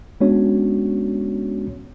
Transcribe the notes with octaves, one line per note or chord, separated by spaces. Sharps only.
G#3 B3 C#4 D4 F#4 C#5